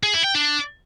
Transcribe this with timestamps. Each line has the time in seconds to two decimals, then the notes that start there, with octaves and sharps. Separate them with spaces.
0.03 G#4
0.14 E4
0.24 G5
0.35 D4